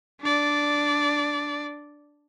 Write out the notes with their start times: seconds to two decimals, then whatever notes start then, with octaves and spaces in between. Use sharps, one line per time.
0.21 D4 D5